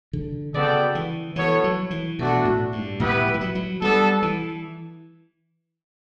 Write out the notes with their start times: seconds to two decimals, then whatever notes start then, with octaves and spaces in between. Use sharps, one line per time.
0.13 D3
0.54 C#3 B3 F#4 A4 D5 G5
0.95 E3
1.36 E3 B3 F#4 A4 C#5
1.64 F#3
1.90 E3
2.19 B2 A3 D4 F#4
2.45 A2
2.72 G2
3.00 A2 B3 E4 G4 B4
3.27 F#3
3.34 E3
3.41 F#3
3.55 F#3
3.81 G3 B3 D4 A4
4.22 E3